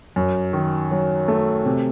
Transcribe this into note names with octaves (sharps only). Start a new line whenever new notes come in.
F#2
D#3
F#3
A3
C3